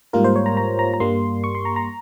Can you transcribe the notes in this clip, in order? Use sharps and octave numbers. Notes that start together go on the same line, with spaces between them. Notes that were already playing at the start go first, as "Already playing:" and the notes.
G#2 G3 A#3 F4 A#4
C5
C#5
A#5
A#5
A#5
A#5
G2 G3 A#3 C6
C#6
C6
A#5
A#5